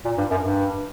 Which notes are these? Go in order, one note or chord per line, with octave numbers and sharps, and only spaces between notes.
A#2
G2
F#2
G2